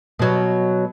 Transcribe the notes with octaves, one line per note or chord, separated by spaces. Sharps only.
B2 F#3